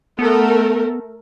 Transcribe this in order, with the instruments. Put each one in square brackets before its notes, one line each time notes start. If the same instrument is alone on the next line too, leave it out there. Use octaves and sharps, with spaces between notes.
[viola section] A3 A4 A#4 [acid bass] B3